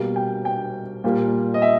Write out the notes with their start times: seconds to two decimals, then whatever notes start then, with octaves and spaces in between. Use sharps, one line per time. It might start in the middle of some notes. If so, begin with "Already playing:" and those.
Already playing: B2 G3 A#3
0.16 G5
0.45 G5
1.04 A#2 G3 A#3
1.54 D#5
1.62 E5